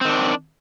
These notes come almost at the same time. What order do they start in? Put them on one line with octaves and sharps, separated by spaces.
C4 D#3 D4